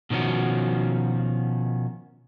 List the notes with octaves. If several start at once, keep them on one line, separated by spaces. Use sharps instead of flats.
B2 D#3 F3 C#4 F#4